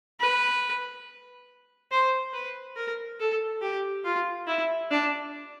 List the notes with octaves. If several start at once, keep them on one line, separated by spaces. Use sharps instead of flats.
B4
C5
B4
A#4
A4
G4
F4
E4
D4